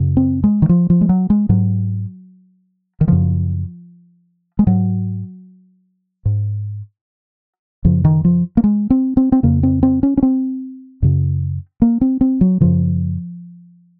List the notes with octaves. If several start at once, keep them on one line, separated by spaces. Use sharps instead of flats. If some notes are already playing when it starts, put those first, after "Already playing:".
Already playing: F#2 C#3
C4
G#3
D#3
F3
F3
G#3
F#3
G#3
G#2 F#3
D#3
F#2 C#3 F3
G#3
G#2 F#3
G#2
F#2 C#3 F3
D#3
F3
A#3
G#3
C4
C4
C4
F2 C#3 A#3
C4
C4
C#4
C#4
C4
F#2 C#3
A#3
C4
C4
F#3
F#2 C#3 F3